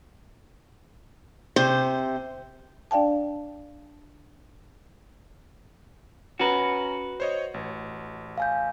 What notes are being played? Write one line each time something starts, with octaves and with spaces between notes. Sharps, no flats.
C3 C5
D4 D5 F5 G5 A5
C#4 F#4 B4 A#5
C5 C#5 D#5
A1
F5 G#5 G6